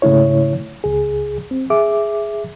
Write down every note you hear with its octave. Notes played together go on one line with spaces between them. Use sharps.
G#2 C#3 A3 E4 C#5
C#2 G#4
C4
G#4 E5 D6